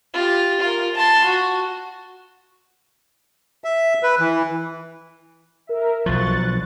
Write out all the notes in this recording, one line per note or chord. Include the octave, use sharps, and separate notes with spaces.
F4 G4
F4 A#4
A5 C6
F#4
E5
B4
E3
A#4 E5
B1 F3 C#6 F#6 A6